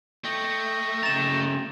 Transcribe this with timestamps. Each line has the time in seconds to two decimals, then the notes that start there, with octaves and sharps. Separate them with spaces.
0.24 A3 D#5 G5 C#6
1.03 C#3 A#5 A6 E7